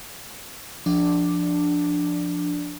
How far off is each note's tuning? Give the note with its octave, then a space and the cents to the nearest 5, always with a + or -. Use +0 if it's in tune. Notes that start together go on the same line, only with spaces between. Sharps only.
F3 +0 D4 +0